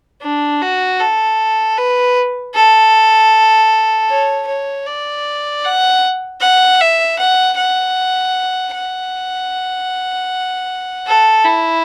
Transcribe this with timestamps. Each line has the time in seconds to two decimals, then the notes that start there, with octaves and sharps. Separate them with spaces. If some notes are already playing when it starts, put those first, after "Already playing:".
0.22 D4
0.61 F#4
0.99 A4
1.77 B4
2.54 A4
4.10 C#5
4.47 C#5
4.86 D5
5.64 F#5
6.41 F#5
6.80 E5
7.19 F#5
7.57 F#5
8.74 F#5
11.06 A4
11.44 E4